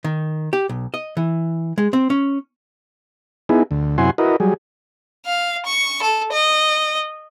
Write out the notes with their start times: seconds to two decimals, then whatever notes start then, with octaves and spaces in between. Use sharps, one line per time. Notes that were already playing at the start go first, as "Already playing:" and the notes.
0.04 D#3
0.53 G4
0.69 B1
0.94 D#5
1.17 E3
1.78 G#3
1.93 C4
2.10 C#4
3.49 B3 D#4 E4 G#4
3.71 D2
3.98 F#2 C3 E4 F#5 G#5 C6
4.18 E4 F#4 A#4 B4 D#5
4.40 F#3 G3 G#4
5.26 F5
5.66 C#6
6.02 A4
6.33 D#5